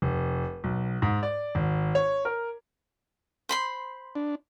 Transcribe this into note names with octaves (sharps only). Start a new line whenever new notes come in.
F1
B1
G#2
D5
G#1
C#5
A#4
C5 B5 C6
D4